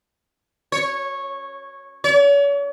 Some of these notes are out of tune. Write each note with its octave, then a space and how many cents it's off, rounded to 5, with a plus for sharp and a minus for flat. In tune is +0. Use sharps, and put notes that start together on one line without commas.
C#5 -10
C#5 +40